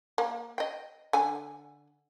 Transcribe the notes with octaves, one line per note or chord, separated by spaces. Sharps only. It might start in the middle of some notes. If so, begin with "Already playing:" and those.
A#3
D#5 G5
D3 G#5